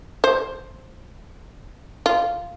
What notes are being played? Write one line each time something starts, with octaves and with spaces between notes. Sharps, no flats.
C5
F4